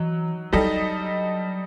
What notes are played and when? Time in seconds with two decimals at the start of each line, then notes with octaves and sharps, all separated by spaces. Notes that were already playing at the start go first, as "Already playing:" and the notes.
Already playing: E3 F#3 D#4
0.53 F#3 G3 D#4 A4 D#5